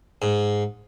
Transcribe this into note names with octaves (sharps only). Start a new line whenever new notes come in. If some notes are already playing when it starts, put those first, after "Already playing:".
G#2